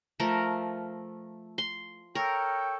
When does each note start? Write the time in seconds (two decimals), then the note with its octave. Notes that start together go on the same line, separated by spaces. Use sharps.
0.20 F3 A3 A#4
1.58 C6
2.15 A4 A#4 C#5 G5